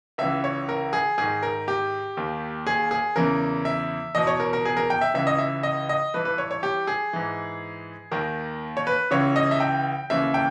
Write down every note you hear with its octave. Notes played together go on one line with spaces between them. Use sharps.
C#2 C#3 E3 E5
C#5
A#4
G#4
G#2 D#3 G#4
A#4
G4
D#2 D#3
G#4
G#4
E2 C#3 E3 A#4
E5
E2 B2 D#5
C#5
A#4
A#4
G#4
A#4
G5
E5
C#2 C#3 E3 E5
D#5
E5
D#5
D#5
G2 E3 B4
B4
C#5
C#5
G4
G#4
G#2 E3
D#2 D#3 A#4
C#5
B4
C#2 C#3 E3 C#5
D#5
E5
G5
D#2 C#3 E3 E5
G5